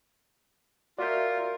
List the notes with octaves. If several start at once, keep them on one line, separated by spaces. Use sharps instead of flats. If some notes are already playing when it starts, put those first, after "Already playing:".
F4 F#4 A#4 D5 E5 G6